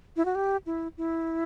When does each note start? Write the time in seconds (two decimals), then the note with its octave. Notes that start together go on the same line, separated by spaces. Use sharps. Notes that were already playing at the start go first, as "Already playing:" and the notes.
0.17 E4
0.25 F#4
0.35 G4
0.66 E4
0.98 E4